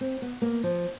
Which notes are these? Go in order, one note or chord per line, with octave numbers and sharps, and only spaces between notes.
C4
B3
A#3
F3